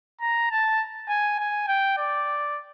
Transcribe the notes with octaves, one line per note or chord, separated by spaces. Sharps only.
A#5
A5
G#5
G#5
G5
D5